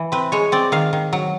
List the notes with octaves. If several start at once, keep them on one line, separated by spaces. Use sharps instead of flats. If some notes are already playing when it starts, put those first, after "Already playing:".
Already playing: E3
C4 B4
G#3 C#5
C4 D5
D#3 F5
D#3
F#3